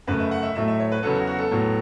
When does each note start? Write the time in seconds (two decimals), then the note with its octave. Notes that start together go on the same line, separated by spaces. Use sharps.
0.07 F#2 C#3 A3 B4
0.20 E5
0.31 F#5
0.43 E5
0.55 A2 F#3 A3 E5
0.68 E5
0.80 C#5
0.92 B4
1.03 E2 C#3 F#3 B3 A4
1.15 F#4
1.27 F#4
1.39 A4
1.51 A2 F#3 B3